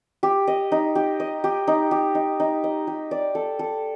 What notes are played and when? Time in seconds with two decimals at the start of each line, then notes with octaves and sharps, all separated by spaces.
0.23 G4
0.47 D#5
0.72 D#4
0.95 G4
1.20 D#5
1.44 G4
1.67 D#4
1.91 G4
2.15 D#4
2.40 D#4
2.64 D#5
2.87 G4
3.11 D5
3.35 A4
3.59 A4